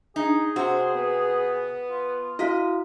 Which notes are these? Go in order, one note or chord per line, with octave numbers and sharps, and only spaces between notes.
D#4 G#4
C3 F#4 C5
B3
F4
E4 F#4 D#5 F5